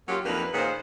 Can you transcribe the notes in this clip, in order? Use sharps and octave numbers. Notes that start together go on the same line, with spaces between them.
F#3 A#3 C#4 F4 G4
F2 A#3 D4 D#4 B4
A#2 D#3 C#4 G#4 C5 F#5